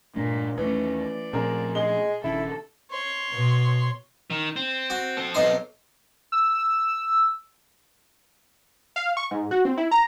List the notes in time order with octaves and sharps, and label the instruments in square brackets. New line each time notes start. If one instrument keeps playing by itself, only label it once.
[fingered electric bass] G2 A3 D4 [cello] A#2
[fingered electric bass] D#2 [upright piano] E3 [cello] A3 C#4
[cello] D5
[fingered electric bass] A#2 F3 A3 [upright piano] C4 G#4 A#4
[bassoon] G#3 [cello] G#4 [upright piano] G7
[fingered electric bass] D#1 D#2 C#3 [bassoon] E4 [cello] A4
[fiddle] C#5 C6
[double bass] B2
[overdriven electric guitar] D#3
C4
[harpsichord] F#4
[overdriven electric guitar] C4 A4
[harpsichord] B1 D#4 C6
[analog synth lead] E6
[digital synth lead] F5
C#6
G#2
F#4
C4
E4
A#5